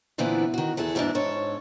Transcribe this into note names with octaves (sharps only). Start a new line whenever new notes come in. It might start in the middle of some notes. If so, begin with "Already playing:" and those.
A#2 D3 E3 B3 C4 E4
D#3 F#4
E2 E3 G#4 A4 F#5
E2 G#2 B2 E3 D4
G#2 A4 C#5